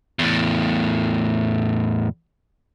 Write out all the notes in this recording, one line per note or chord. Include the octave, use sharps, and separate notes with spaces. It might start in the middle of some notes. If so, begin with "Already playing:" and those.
E2 A2